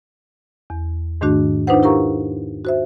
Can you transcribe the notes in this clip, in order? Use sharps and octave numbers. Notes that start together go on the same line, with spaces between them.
E2
G#2 D#3 A3 D4 F#4
D4 D#4 F4 B4 C5 F#5
E4 G4 A#4 F5 A#5 C#6
F#4 C5 E5